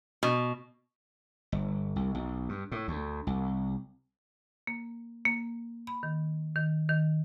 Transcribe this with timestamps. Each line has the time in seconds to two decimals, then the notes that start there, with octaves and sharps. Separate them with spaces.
0.23 B2
1.52 G1
1.96 C2
2.15 B1
2.49 G2
2.72 A2
2.88 D2
3.27 C2
4.67 A#3
5.25 A#3
5.87 B5
6.03 D#3
6.56 D#3
6.89 D#3